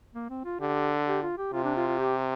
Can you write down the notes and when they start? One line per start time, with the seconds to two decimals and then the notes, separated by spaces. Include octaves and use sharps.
0.15 A#3
0.30 C4
0.45 F4
0.60 D3 G4
1.07 G4
1.22 F4
1.38 G4
1.53 C3 F4
1.64 D4
1.77 F4
1.87 F4
1.99 G4